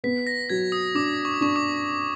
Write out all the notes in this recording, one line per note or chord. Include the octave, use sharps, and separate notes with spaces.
B3 B6
A#6
F#3 G#6
D#6
D4 D6
C#6
D6
D4 C#6
D6